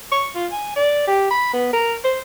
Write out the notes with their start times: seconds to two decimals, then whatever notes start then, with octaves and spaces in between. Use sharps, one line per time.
0.11 C#6
0.35 F4
0.51 G#5
0.76 D5
1.07 G4
1.30 B5
1.53 B3
1.73 A#4
2.04 C5